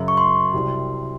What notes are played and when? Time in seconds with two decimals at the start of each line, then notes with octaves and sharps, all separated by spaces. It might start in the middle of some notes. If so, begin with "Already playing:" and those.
Already playing: F#2 C#3 F#3
0.08 C#6
0.17 C6
0.53 C2 C3 F#3